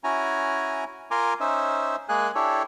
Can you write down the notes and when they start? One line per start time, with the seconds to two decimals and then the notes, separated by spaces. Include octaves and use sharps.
0.04 C#4 E4 F#4 G#5 A#5
1.11 F4 A#4 G#5 A#5 C6 D6
1.40 C#4 D#4 C5 E5
2.09 G#3 A#3 G#4 G#5 F#6
2.35 D4 E4 G4 A4 C#5